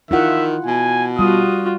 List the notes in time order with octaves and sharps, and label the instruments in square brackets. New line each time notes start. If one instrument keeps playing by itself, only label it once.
[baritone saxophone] D#3 [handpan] E4 F4 F#5 [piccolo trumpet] E5
[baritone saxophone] B2 [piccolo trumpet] G#5
[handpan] G3 [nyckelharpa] F4 F#4 [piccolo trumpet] D#6